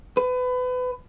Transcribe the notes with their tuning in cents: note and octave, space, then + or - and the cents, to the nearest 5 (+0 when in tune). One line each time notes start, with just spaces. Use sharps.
B4 +30